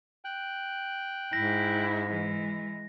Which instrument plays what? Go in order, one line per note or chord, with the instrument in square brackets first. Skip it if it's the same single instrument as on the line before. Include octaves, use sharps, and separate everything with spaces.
[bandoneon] G5 F#6
[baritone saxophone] G#2 [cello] E4 [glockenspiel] A#6
[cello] E3 G#3